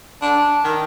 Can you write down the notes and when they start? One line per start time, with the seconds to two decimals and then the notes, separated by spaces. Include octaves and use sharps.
0.22 D4
0.64 D#3